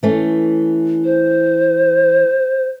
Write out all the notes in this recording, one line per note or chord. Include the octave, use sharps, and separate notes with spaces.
E3 A3 C#4
C5